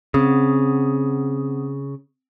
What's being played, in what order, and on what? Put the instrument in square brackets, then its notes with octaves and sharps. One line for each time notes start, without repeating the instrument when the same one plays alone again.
[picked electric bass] C#3 [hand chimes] C4 D#6